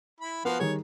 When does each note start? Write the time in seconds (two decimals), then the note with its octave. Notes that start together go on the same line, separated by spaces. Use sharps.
0.20 E4 B5
0.45 F3 B3 F#4 F5
0.60 D#3 G3 G#4 C#5